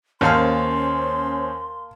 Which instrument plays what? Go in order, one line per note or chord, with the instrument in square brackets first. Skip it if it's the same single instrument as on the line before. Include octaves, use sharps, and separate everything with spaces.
[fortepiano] D#2 F5 F6 [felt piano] A#3 A5 [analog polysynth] C#4 C5 [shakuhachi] C6